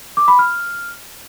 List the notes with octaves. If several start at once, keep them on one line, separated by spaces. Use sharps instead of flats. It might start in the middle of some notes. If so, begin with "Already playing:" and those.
D6
B5
F6